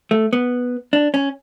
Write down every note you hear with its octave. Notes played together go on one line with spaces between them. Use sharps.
A3
B3
D4
C#4